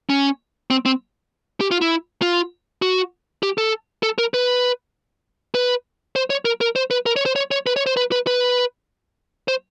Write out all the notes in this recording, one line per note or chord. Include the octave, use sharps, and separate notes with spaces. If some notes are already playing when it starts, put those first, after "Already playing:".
C#4
C4
C4
G4
F4
E4
F4
F#4
G4
A4
A4
A#4
B4
B4
C5
C#5
A#4
A#4
C5
B4
A#4
C#5
C5
C#5
C#5
B4
C#5
C5
B4
B4
B4
C5